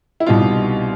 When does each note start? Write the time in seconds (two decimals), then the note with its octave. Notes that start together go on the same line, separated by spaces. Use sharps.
0.20 E4
0.26 C2 B2 G3 C4 D#4 F4